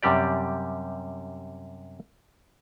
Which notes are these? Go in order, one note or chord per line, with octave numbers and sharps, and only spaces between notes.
F#2 C3 G3 G4 D5